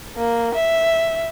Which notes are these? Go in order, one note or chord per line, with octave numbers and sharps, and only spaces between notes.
A#3
E5